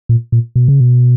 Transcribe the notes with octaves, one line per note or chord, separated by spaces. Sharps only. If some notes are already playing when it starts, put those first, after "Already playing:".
A#2
A#2
B2
C#3
B2